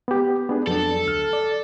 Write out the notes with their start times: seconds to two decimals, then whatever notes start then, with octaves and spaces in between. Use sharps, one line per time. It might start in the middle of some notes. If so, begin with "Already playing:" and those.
0.08 B3 G4
0.49 B3 D4 G#4
0.67 F2 F#3 D4 A4
1.05 D2 F6
1.33 D5